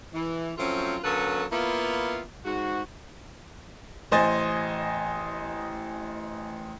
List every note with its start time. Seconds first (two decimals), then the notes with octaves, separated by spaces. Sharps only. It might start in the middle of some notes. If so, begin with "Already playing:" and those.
0.14 E3
0.58 F3 F#3 A3 C4 C#4 F4
1.04 D3 F#3 A#3 C#4 A4 B4
1.52 A#3 B3 E4 F4
2.45 G#2 F#4
4.12 A1 C5 D#5 G#5 A6